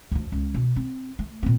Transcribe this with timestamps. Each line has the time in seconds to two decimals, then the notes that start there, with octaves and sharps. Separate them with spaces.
0.12 D2 F3
0.32 C#2
0.54 B2
0.76 C4
1.19 A3
1.43 A#2 C4